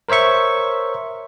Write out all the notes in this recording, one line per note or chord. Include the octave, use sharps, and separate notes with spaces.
A#4 C5 C#5 E5 C#6